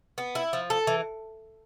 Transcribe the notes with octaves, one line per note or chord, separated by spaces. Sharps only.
B3
E4
F3
A4
E3